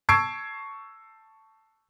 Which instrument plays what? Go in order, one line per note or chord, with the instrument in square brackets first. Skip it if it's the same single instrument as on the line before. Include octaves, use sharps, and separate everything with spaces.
[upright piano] A5 C#6 E6 G#6 C7 D7